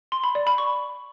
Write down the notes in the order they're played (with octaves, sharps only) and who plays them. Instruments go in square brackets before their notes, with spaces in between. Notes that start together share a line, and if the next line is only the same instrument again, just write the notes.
[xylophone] C6
B5
D5
B5
C#6